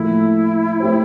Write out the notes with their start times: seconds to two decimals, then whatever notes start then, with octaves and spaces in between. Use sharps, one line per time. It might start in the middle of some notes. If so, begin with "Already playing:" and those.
Already playing: A2 F3 A#3 E4
0.80 A3 C4 G4 C5